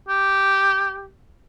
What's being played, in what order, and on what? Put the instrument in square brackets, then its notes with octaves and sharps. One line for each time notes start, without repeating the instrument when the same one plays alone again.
[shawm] G4